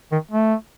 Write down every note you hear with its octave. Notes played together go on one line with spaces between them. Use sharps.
D#3
A3